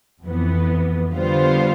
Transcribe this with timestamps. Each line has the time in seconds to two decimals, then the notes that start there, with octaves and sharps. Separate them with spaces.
0.23 F2 E3 B3
1.12 D3 G3 B3 F4 C5